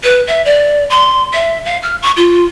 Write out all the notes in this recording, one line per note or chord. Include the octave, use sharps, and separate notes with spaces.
B4
E5
D5
C6
E5
F5
F6
C#6
F4